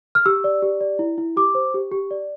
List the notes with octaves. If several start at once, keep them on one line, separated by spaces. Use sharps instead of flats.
F6
G4 E6
D5
G4
D5
E4
E4
G4 D6
C5
G4
G4
D5